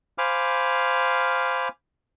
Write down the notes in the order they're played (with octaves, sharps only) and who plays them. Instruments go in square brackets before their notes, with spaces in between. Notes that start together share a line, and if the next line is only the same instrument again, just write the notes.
[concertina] C5 F5 G#5 B5 D6 F6